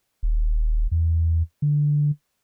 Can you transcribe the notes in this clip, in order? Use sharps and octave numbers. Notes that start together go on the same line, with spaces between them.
D#1
E2
D3